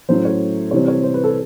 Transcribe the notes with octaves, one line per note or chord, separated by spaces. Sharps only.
A2 F#3 A3 C#4 C5
C#5
C3 E3 G3 C4 C#5
C#5
C5
B4
A4